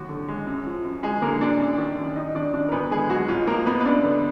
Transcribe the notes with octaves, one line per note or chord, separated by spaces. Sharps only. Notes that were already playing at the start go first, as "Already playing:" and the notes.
Already playing: D#2 F#3 F#4
D3
G#3
F#2
F3
F#2
D2 G#3 G#4
D3 A#3 A#4
D2 D4 D5
F#2
D#3
F#2
F#2 D#4 D#5
D#3 D4 D5
F#2 D4 D5
A#4
D2 B3 B4
D3 G#3 G#4
F#3 G#3 F#4
G#2 F4
F3 A#3 A#4
G#2 B3 B4
B4
F#2 D4 D5
D3 B3 B4